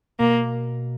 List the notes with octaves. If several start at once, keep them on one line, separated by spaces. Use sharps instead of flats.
B2 A#3